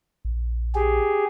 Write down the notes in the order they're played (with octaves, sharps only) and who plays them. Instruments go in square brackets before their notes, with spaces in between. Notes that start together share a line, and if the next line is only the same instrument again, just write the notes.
[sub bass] A#1
[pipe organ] G4 G#4